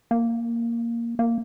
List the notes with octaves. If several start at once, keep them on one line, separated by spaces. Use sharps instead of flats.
A#3
A#3